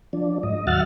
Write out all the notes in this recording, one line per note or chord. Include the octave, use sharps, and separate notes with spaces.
F3 D4
G#2 D#5
D#2 F#3 E5 F#5 F6 A6